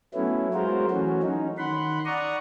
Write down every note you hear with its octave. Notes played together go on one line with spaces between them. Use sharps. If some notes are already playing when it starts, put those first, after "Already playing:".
F#3 A3 B3 C#4 E4
F#3 G#3 F4 F#4 A#4 C5
E3 F#3 A3 C#4 F#4
C#4 D#4
D#3 F#5 B5 C6
D5 F#5 A#5 C#6 D#6